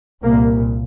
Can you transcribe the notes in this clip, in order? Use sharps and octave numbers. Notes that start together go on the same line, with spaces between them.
C2 A#2 A#3